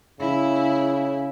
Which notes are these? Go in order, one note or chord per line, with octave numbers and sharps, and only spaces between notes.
C#3 E4